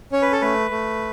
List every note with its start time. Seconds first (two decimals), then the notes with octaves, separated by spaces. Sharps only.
0.12 C#4 C#5
0.22 B4
0.32 A4
0.41 A3 B4
0.71 A3